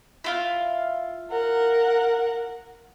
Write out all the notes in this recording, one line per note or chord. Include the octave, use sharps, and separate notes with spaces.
E4 F4 F5
A#4 F#5